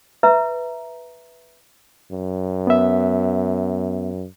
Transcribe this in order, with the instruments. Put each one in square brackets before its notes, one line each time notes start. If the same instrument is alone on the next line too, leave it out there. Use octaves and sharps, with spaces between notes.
[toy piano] B4 E5 A#5
[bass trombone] F#2
[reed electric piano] B3 E5